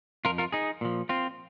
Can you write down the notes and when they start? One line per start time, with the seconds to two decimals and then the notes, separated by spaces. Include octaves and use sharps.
0.25 F2 F3 F4 A#4
0.38 F4 A#4
0.52 D#4 G#4
0.81 A#2 F3
1.09 C4 F4